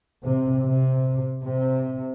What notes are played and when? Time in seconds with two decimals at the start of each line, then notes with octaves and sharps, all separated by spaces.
0.24 C3
0.64 C3
1.45 C3